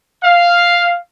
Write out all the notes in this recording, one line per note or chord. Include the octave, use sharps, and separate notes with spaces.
F5